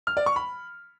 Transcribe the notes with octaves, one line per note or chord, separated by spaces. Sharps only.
F6
D5
C#6
B5